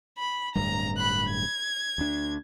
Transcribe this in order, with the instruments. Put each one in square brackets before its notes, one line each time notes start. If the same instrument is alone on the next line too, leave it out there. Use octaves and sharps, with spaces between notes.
[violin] B5
[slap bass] D1 G2 [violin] A#5
[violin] B5 F#6
G#6
[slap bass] D2 D4